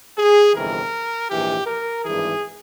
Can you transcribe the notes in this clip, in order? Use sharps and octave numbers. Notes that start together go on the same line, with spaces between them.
G#4
G1 F2 C3 E3 A#4
A#1 G#2 E3 G4
A#4
G#1 G2 E3 G#4